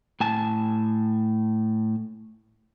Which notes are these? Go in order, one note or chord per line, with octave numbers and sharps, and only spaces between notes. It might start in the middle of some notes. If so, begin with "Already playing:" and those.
A2 G#5 A5